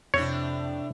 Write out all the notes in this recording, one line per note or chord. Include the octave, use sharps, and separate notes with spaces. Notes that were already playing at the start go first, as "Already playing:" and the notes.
F2 A2 C3 D4 C#5